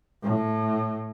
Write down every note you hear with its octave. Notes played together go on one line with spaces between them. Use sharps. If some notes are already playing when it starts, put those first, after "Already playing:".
A2